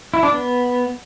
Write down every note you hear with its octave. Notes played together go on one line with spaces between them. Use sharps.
E4
D4
B3